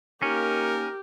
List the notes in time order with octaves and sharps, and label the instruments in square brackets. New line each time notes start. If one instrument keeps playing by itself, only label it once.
[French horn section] A#3 D#4 [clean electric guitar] C#4 [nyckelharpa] G4 [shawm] A#4